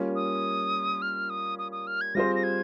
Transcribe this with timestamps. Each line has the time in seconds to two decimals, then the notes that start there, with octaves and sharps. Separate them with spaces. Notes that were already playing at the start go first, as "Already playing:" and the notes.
Already playing: G3 A#3 C#4 F4
0.16 D#6
1.02 F6
1.30 D#6
1.59 D#6
1.72 D#6
1.87 F6
2.01 G#6
2.15 G3 C4 F4 G#4 C5 A#6
2.35 A#6
2.44 G#6